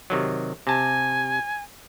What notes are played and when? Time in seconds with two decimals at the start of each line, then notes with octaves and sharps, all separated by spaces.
0.10 C3 D#3 F#3
0.67 C3 G#5 A5